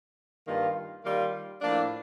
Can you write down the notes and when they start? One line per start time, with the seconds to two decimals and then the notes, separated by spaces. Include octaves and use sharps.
0.48 G2 D#3 A#3 F4
1.04 D#3 G3 A#3 F4
1.61 A2 F3 A#3 D4